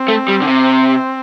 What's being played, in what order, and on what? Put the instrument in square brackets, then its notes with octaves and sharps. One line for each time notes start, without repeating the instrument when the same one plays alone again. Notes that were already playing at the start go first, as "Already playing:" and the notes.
Already playing: [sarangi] C4
[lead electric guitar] A3
G3
D3
C3